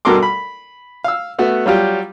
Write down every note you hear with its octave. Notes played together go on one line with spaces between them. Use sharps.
G2 B2 A4 A#4 C6 D6
B5
F5 E6
A3 B3 F#4
F#3 G3 F4 G4